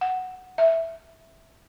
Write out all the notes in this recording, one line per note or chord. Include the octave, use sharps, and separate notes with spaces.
F#5
E5